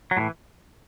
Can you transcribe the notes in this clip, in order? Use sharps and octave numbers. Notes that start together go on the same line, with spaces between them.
F#3
A2 E3 G#3